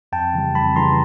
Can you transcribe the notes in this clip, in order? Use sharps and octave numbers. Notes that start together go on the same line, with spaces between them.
F2 G5 A5
C#3 E3 G3
F2 A5 B5
C#3 E3 G3 A#5 C6